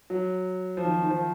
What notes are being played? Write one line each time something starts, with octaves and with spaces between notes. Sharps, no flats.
F#3
F3
D#3
D#3
F3